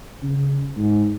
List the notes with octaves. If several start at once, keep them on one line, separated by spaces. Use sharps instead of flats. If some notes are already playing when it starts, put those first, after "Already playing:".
C#3
G#2